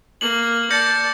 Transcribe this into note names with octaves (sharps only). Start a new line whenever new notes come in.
A#3 F#7
D5 A5 G6 A#6 C#7